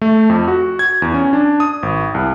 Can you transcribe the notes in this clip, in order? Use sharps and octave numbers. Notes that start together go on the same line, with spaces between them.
A3
F2
F#4
G#6
E2
C#4
D4
D#6
G#1
C2